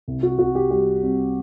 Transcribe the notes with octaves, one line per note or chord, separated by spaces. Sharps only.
C2
F#4
C2 F#4
G4
G3 G4
G3 C4